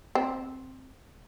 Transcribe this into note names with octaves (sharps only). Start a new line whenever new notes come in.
C4